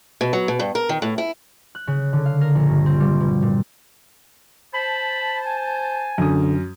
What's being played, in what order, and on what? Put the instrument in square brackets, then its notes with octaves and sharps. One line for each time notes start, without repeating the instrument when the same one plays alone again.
[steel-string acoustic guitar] B2
F#3
B2
G2
A#4
D#3
A2
E4
[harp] F#6
C#3
D3
F5
A#4
A#1
G2
C4
G3
B2
A#2
[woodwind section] C5 A5 [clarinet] B5
[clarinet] G#5
[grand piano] F#2 D#6 [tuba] D3